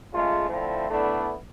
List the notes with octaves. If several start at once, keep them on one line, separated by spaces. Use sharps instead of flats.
C#3 G#3 A3 F4
D3 F3 A3 C4 E4
D3 A3 B3 D4 E4